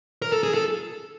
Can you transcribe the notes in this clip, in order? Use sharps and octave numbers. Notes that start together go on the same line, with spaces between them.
A#4
A4
G#4
A4